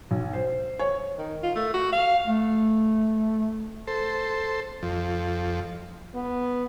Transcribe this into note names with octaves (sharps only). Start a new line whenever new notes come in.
B1
C5
C#5
D#3
F4
A3
F#4
F5
A3
A4 C5
F2
B3